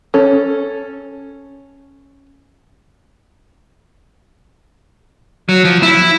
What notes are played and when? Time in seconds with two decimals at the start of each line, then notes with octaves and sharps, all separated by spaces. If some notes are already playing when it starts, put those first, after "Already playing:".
0.14 C#4 A4
5.49 F#3
5.65 F3
5.83 E4